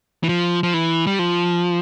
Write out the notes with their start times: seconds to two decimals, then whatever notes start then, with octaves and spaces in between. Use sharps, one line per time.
0.23 E3
0.29 F3
0.63 F3
0.74 E3
1.07 G3
1.19 F3